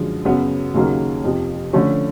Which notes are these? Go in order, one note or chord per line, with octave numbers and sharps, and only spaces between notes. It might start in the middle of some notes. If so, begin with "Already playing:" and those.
Already playing: F#2 D3 F3 G#3
F#2 C#3 F#3 B3
D#2 C#3 F#3 A#3 D#4
F2 C3 F3
D3 F3 A3 C#4